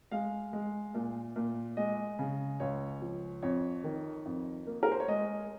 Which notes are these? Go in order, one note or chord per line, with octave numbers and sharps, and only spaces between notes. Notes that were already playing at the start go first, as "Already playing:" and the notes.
G#3 F5
G#3
A#2
A#2
G#3 D#5
C#3
C#2 C#5
F3
F2 C#5
D#3
F2
A#3
A#4
C5
C#5
G#3 D#5